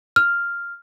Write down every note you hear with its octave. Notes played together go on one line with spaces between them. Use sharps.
F6